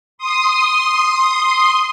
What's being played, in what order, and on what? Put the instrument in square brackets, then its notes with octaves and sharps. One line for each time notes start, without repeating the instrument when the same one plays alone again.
[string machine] C6 D#6